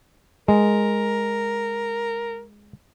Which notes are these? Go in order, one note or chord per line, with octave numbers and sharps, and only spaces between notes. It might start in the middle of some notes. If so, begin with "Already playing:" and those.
G#3 A#4